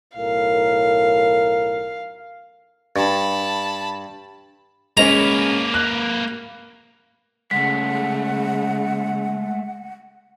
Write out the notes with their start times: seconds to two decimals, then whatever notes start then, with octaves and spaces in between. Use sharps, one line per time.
0.16 B1 A2 A#4 F5
2.96 G2 A5 B5
4.97 G#3 A#3 C#4 B4 A#5
5.74 F#6
7.51 C#3 G#3 A3 F#5 B6